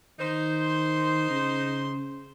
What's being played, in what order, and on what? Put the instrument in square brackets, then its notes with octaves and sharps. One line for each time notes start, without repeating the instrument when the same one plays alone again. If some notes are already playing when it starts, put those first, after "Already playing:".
[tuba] D#3 [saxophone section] D#4 C5
[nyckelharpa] C6
[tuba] C#3